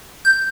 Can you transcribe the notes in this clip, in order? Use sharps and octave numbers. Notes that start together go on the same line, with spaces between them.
G6